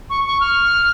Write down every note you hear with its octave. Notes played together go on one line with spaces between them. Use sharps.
C#6
C#6
F6